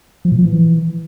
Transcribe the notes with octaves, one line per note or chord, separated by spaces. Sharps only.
F3
A#2
F3
E3